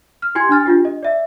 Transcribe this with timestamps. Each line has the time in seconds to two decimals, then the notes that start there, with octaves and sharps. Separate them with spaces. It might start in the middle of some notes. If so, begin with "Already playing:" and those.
0.22 F6
0.35 E4 G4 G#5 C6 G#6
0.49 D4 G#5 F6 A6
0.66 D4 F4 G4
0.85 D#5
1.03 D5 E5